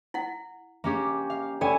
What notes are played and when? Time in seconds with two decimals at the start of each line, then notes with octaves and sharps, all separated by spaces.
0.14 E4 F#5
0.84 A#3 C#4 G4
1.30 F5
1.61 C#4 E4 A4 D5 G5 G#5